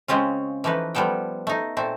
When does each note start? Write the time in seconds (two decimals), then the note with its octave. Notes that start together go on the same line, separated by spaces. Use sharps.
0.08 C#3 G#3 C4 C#4 F4
0.64 E3 F3 A3 D#4 B4
0.95 F3 G3 B3 A4 G5
1.47 A3 D#4
1.77 A#2 A3 C4